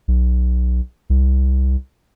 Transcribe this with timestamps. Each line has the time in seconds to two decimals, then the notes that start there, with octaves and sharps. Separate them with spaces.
0.08 B1
1.10 C2